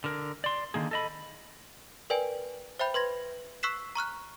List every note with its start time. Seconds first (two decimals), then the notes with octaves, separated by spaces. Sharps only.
0.04 D3 A#4
0.44 D5 C6
0.74 D3 D#3 A#3 G#4
0.91 A4 D#5 B5
2.10 A#4 B4 D5 G5 G#5
2.79 C5 E5 G5 B5 G6
2.94 B4 C6 G#6 A#6
3.63 C#6 E6 F#6 B6 C7 E7
3.95 A#5 C#6 F6 F#6